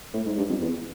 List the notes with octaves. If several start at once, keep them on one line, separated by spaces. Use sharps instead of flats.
A2
G#2
G2
F2
E2